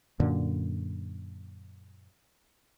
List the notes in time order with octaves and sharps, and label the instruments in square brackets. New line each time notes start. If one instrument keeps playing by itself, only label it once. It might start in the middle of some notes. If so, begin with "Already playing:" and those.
[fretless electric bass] F#2 A#2 D3